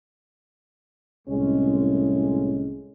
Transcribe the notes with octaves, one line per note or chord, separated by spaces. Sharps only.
C2 A2 G#3 C#4